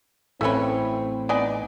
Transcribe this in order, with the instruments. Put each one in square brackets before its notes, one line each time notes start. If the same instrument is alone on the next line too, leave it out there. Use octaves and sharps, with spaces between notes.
[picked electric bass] A1 A2 [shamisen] A3 C#4 B4 [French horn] C4 [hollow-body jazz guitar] E4 C#5
[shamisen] B3 D#4 G#5 [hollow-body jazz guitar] D5